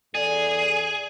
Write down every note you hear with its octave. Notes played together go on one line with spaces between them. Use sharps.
E2 G#4 A4 D5